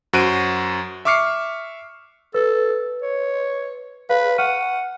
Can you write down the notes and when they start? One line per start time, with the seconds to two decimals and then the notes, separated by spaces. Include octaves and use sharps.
0.13 F#2 F#4 C5 F#6 D7 D#7
1.05 E5 C#6 D6 F6 C7 C#7
2.34 A4 B4
3.02 C#5
4.09 B4 F5
4.38 F#5 C#6 F6 D#7